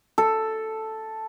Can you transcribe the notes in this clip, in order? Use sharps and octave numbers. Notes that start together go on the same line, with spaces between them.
A4